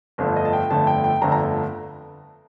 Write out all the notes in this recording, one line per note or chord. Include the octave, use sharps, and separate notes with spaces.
G1 F2 D3 A3
D#5
A5
G5
G1 F2 D3 A3 A5
G5
G5
G1 F2 D3 A3 A#5
A#5